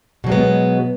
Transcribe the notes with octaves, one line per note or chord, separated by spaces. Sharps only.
B2 F#3 G#3 B3